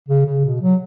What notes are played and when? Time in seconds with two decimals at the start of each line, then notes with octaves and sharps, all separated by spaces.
0.08 C#3
0.26 C#3
0.45 B2
0.62 F#3